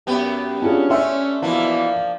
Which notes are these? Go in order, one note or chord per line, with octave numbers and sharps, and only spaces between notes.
F#2 B3 G4
C#4 D4 F4 G#4
A3 D4 E5 C6
B2 E3 F3 A#3 D4